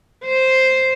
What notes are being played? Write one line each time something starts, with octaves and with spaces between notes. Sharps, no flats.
C5